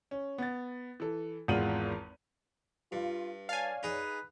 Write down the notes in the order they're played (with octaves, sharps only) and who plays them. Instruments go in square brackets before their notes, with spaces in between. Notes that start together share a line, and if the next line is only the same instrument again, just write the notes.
[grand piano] C#4
B3 A6
E3 A4
G#1 E2 G#3 F4 D#7 F#7
[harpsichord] G2 [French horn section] F4
[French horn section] C#5 D5 [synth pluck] F5 G#5 [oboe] A5
[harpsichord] D#4 G#4 [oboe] B4